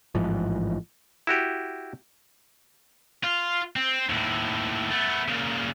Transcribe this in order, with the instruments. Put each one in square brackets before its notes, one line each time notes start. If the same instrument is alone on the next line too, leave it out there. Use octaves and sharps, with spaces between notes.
[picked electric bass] A1 G#2 E3 F3
[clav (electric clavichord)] E4 F#4 G4
[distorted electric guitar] F4
C4
D#2 A2
A3 B3
A#2 C#3